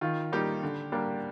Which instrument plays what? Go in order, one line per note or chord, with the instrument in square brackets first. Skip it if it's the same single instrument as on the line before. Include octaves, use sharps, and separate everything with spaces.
[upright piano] D#3 F4
G3 A#3 D#4 G4
D3
G3 A#3 D4